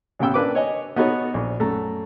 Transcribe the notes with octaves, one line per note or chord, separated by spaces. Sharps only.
A1 C#3 B3 G5 E6
A#3 D4 B4 D6
C#5 D#5 G#5
B3 D#4 F#4 A4 C#5
A#1
F#2 A3 A#5